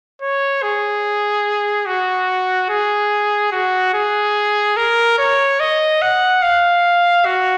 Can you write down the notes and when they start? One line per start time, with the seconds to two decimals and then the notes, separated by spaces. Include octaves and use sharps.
0.22 C#5
0.63 G#4
1.86 F#4
2.70 G#4
3.52 F#4
3.94 G#4
4.77 A#4
5.19 C#5
5.60 D#5
6.02 F#5
6.42 F5
7.25 F#4